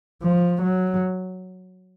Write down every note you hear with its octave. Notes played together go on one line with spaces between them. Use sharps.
F3
F#3